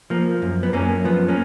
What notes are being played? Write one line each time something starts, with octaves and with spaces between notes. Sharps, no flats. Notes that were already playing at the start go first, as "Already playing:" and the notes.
F3 A#3
F#2
B3
F#2 A#3 C#4
F3 B3
A#3 C#4